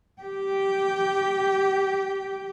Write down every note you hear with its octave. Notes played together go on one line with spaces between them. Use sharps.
G4 G5